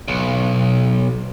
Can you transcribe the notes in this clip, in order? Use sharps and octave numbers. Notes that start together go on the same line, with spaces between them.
B1